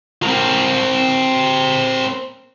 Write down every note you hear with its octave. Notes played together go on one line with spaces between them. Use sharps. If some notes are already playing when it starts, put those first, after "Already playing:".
C4 A#4